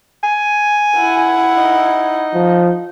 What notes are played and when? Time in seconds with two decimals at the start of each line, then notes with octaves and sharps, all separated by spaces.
0.23 G#5
0.97 E4 F#5
1.57 D#4
2.34 F3